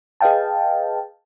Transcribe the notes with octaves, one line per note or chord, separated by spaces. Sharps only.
G#4 B4 D#5 F5 G5 A5